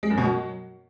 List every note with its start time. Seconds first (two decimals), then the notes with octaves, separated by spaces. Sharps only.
0.03 G#3
0.10 F#2
0.18 B2
0.25 F#3